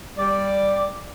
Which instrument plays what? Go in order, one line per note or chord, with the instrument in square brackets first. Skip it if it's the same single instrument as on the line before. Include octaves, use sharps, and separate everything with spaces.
[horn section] G3 D5